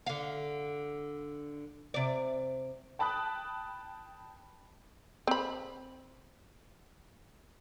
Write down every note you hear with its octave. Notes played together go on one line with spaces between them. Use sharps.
D3 F5
C3 D5
G5 A5 B5 D#6 F#6
C4 B5